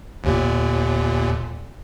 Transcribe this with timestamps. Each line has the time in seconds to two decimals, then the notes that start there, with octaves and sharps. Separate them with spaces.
0.24 G1 D#2 A#2